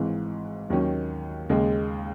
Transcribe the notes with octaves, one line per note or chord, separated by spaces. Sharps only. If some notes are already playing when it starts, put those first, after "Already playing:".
Already playing: G#1 G#2 E3
D#2 D#3 F#3 C#4
D#2 C#3 G#3